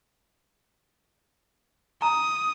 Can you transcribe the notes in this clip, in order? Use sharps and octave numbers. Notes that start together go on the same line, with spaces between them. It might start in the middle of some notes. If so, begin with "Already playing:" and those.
A#5 D#6